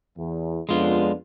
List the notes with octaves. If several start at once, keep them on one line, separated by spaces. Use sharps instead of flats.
E2
F2 G#3 B3 D4 F4